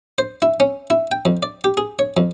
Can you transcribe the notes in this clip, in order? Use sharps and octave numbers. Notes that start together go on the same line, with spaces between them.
C5
E4
C#4
E4
G5
F2
D5
G4
G#4
C#5
F2